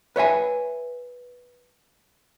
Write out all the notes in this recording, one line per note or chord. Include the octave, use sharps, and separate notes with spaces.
B4 C#5 E5 G#5